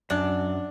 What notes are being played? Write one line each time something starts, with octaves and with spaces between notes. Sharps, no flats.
F#2 D4